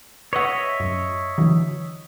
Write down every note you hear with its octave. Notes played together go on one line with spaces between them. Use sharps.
B4 C#5 D#5 E5 F#5
F#2
D3 E3 F#3